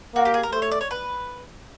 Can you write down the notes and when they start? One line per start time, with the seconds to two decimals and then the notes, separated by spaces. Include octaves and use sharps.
0.15 A#3 F#4
0.25 G4
0.34 G#4
0.43 A#4
0.52 A3 C5
0.62 C#5
0.71 D5
0.81 C#5
0.91 B4